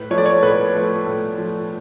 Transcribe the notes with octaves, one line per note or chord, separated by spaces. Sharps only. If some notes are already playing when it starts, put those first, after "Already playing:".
Already playing: A2 B4
F3 A3 C#5
D5
C#5
A2 B4
F3 A3
A2
F3 A3